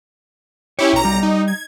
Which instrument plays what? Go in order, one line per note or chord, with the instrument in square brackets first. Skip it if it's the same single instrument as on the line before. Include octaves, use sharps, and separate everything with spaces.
[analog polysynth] C#4 E4 G4 [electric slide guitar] C#5
[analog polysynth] B1 A#5
[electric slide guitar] G3
[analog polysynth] D#4
G#6